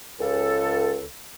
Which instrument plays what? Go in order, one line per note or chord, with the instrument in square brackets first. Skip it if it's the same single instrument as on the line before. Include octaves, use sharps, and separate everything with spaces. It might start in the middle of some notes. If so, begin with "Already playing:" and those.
[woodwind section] C#2 A4